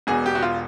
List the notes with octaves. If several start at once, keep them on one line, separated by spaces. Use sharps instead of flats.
E1 E2 B2 G#4
G4
F#4
F4